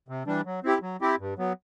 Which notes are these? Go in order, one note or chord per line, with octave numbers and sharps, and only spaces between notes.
C3
E3 G3 D4
F#3
C4 E4 G4
F#3
C4 E4 G4
G2
F#3 B3